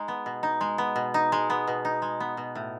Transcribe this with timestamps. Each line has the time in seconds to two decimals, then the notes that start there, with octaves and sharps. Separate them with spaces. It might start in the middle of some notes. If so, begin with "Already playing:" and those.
Already playing: G#3 D#4
0.08 B3
0.26 B2
0.43 D#4
0.61 G#3
0.78 B3
0.96 B2
1.14 D#4
1.32 G#3
1.50 B3
1.67 B2
1.85 D#4
2.02 G#3
2.20 B3
2.37 B2
2.55 A2